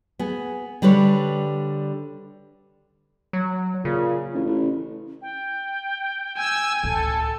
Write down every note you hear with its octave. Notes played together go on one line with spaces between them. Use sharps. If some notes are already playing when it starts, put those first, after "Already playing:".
B3 G#4
D3 G3 D4 B4 C#5
F#3
A#2 C#3
A1
A1
G5
G#5 E6
C#2 A2 A4